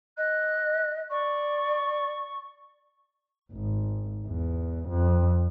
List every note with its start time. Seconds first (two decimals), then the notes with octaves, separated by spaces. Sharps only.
0.18 D#5 F#6
1.11 D5 C#6
3.53 G#1
4.27 E2
4.89 F2